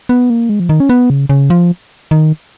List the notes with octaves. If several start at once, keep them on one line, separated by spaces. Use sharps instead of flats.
B3
A#3
G#3
F3
D#3
C#4
B3
C#3
C#3
F3
D#3